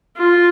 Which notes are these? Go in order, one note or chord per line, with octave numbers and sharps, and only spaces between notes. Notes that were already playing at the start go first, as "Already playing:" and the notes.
F4